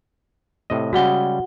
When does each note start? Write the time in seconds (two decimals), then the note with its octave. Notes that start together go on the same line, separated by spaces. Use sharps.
0.70 A2 C3 D#5
0.93 C#3 G3 G#3 F#4 F#5 G7